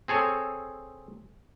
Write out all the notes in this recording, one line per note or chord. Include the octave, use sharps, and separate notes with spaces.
C4 G#4 A4 C#5